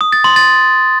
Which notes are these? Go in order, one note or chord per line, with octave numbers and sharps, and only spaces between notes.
D#6
A6
C6
A6